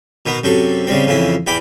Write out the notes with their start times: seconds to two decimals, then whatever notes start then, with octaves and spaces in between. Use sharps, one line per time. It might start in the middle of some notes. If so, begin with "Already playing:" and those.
0.26 B2 D#3 B3
0.44 F#2 C3 A4 C#6
0.87 C#3 G3 C4
1.06 F2 C#3 E3 E4
1.47 E2 E3 G5 B5 D6